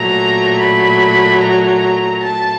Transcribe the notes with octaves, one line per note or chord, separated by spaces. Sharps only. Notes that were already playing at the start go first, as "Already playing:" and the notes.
Already playing: A#2 F#3 A3 A#5
B5
A#5
A5